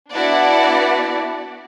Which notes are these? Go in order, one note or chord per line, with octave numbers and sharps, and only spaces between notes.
B3 D4 E4 F#4 D5 F#5